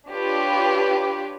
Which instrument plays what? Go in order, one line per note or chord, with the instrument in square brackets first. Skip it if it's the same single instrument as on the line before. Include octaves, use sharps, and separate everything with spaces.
[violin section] D4 F4 G4 B4 C#5